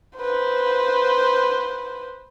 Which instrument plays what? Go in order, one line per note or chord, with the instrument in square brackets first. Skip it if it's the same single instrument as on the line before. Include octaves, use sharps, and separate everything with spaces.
[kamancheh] B4 C5